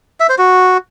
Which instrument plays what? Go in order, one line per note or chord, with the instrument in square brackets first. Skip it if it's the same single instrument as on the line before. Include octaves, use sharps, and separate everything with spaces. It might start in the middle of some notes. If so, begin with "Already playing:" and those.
[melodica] E5
C5
F#4